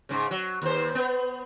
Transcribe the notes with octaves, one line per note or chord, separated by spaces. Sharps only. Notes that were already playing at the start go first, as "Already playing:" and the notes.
G#2 C#3
F#3
D#2 C5
B3